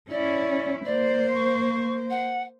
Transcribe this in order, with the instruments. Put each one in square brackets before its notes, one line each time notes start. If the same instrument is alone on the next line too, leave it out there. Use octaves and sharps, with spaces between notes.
[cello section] C#4 E4 [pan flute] D5
[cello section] A#3 C5 [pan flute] D5
[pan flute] C#6
F#5